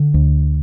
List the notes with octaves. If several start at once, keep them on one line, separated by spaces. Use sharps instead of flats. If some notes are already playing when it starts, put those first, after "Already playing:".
Already playing: D3
D2